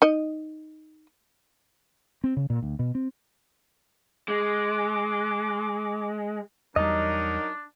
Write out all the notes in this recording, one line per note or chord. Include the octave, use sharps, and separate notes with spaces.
D#4 D#5
C4
C#3
A#2
D2
B2
C4
G#3 D6
E2 F#3 G3 D4 D#4 A#4 D#5